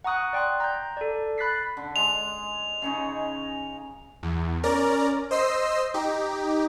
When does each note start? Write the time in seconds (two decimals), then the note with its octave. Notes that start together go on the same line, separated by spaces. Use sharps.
0.04 F#5 A#5 C#6 D#6 F#6
0.33 D5 G5 C6 F#6
0.60 A#5 G6
0.97 A4 D5
1.38 B5 F#6 A6 B6 C7
1.77 D3
1.96 G#3 F7
2.82 C#3 C#4 D#4
4.23 E2
4.63 C#4 A#4 D5 A#5
5.31 C5 D#5 E6 C7
5.94 D#4 G4